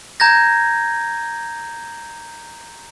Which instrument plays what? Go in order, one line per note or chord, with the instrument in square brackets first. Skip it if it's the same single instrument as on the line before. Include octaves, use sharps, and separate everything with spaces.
[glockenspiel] A#5 G6 G#6 A#6